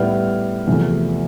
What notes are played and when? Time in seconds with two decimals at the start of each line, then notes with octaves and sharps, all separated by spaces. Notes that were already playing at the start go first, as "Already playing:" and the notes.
Already playing: A2 G3 B3 F6
0.67 E2 C3 F3 A3